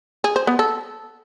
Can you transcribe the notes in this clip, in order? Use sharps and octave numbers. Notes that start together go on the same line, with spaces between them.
G#4
C5
B3
A4